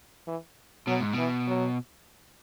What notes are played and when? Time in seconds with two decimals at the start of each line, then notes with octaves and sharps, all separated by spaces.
0.27 E3
0.87 B2 F#3
1.00 G#2
1.13 B2 E3
1.47 F#3